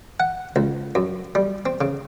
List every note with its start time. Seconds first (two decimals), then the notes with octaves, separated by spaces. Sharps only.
0.20 F#5
0.56 C#2
0.95 F#2
1.35 G3
1.66 C4
1.81 C#3